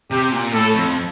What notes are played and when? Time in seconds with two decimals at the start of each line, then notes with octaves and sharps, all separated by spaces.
0.11 C3 G4
0.32 A#2
0.53 A2 A4
0.74 F2